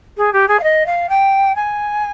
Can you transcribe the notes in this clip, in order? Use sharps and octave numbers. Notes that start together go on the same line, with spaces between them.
G#4
G4
G#4
F5
D#5
F5
G5
G#5